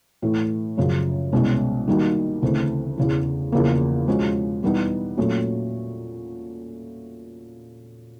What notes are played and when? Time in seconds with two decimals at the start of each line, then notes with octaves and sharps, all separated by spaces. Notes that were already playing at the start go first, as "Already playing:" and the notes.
0.22 A2 E3 A3
0.77 F#2 C#3 F3
1.32 C2 B2 G#3 C#4
1.88 D#3 G3 A#3 D#4 F#4
2.42 D2 C#3 E3 A3 C4
2.98 E2 C#3 E3
3.52 E2 C#3 F3 A#3
4.08 F3 G#3 C#4 F#4
4.63 E3 G3 B3 D#4
5.17 A#2 F#3 A3 C#4